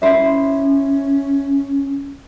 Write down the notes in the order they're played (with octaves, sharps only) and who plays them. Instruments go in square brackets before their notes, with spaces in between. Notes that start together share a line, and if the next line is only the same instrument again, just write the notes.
[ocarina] C#4 [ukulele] E4 C5 E5